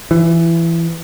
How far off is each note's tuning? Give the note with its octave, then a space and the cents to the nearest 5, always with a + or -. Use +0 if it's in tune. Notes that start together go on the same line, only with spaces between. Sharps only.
E3 +20